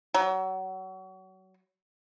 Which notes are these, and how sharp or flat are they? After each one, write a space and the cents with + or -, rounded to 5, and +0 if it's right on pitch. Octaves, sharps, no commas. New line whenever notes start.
F#3 +30